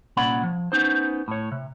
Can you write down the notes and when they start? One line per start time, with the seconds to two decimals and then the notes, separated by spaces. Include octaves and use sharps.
0.17 C2 A#2 C#4 D5 F#5 B5
0.43 F3
0.72 B3 C#4 D#4 C5
1.28 A2 C#5
1.52 C3